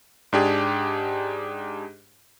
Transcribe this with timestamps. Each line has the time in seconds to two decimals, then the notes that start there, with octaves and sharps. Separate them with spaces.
0.33 G#2 D4 G4 G#4